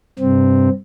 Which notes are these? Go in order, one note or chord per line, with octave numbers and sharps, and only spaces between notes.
G2 C3 C4